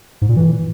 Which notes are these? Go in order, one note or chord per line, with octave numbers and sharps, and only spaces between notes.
G#2
A#2
E3